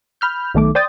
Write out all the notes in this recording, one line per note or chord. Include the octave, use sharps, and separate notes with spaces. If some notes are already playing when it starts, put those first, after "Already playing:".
B5 F6 G6
B1 D#3 A3 D6
C5 D5 G5 D#6 G6 A6